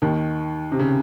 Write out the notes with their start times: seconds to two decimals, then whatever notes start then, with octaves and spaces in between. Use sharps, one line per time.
0.02 D#2 D#3
0.72 C3
0.79 C#3